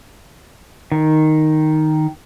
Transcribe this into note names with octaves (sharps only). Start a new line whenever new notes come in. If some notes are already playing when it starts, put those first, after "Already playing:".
D#3